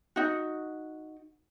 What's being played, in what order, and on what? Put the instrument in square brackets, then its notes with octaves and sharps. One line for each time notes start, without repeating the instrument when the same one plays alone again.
[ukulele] D#4 F#4